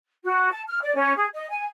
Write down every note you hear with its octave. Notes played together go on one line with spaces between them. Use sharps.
F#4
A5
F6
D5
C#4
G#4
D#5
G#5